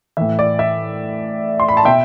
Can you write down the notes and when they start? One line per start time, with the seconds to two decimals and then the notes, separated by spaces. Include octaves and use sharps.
0.17 A2 E3 E5
0.39 D5
0.59 E5
1.60 C6
1.68 B5
1.77 A5
1.85 B2 E5 G5